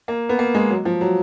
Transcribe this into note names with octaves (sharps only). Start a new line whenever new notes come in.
A#3
B3
A#3
G#3
F#3
F3
F#3